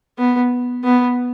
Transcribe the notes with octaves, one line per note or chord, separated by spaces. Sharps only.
B3
B3